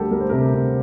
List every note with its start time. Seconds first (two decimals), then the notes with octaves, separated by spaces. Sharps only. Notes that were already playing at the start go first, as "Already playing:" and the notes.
Already playing: D2 G3 G4 A4 A#4
0.11 G3 A#4
0.20 C5
0.29 C3 A#4
0.54 C3